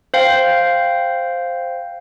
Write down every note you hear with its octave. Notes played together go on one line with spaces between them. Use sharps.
C5 F5 G5